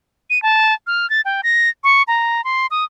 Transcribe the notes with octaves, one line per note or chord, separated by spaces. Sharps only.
D#7
A5
F6
A6
G5
A#6
C#6
A#5
C6
D#6